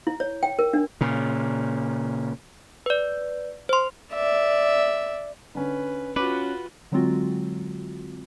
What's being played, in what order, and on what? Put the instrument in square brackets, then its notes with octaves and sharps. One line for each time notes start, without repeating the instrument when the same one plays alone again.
[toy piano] E4
C#5
G5
A#4
D4
[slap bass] A#2 C#3
[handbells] B4 D5
C5 C6
[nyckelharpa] D5 E5
[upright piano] D3 C#4 [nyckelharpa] B4
[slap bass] C#4 [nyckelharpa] F4 F#4 [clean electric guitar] B4 [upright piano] D6
[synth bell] D3 F#3 G#3 C4 F4 F#4